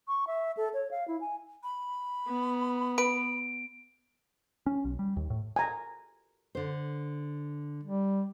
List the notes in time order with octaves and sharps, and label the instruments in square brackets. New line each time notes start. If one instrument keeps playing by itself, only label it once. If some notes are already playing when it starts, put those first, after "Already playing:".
[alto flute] C#6
E5
A4
C#5
F5
E4
G#5
[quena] B5
[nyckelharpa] B3
[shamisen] B4 [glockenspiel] D7
[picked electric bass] C#4
B1
G3
D#2
A2
[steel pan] G#5 A#5
[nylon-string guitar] D3 C5
[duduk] G3